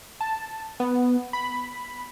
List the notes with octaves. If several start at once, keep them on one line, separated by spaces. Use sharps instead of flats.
A5
B3
B5